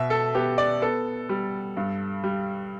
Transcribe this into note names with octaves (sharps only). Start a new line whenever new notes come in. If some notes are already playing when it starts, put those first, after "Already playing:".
Already playing: B2 E5
A4
B3 G4
D5
B3 A4
G3
G2
G3